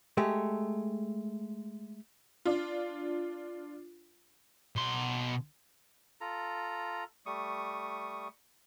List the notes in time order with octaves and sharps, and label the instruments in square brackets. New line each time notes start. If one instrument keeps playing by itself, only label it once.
[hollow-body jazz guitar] G#3 A3 G4
[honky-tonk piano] D4 F4
[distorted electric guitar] B2 C6
[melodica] F4 A4 A#5
G3 A3 C#6 D#6